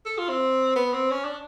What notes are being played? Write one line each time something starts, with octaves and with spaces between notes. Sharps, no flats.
A4
F4
C4
B3
C4
C#4
D4